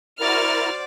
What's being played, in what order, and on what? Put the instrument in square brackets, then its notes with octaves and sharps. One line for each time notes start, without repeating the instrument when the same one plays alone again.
[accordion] E4 A#4 [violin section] F#4 F6 A6 [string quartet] C5 D5